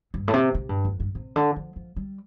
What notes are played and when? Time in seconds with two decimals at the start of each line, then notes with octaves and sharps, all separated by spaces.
0.14 G2
0.28 A2
0.33 C3
0.54 C3
0.69 G2
0.85 F2
1.00 G2
1.15 C3
1.36 D3
1.56 F3
1.76 F3
1.96 G3